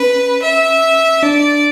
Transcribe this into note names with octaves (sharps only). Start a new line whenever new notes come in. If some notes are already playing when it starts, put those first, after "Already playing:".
Already playing: C#4 B4
E5
D4 D5